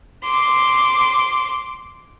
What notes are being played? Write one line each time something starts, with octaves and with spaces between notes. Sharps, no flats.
C6 D6